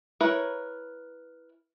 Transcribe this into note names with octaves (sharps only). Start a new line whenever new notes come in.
E4 A#4 B4 C#5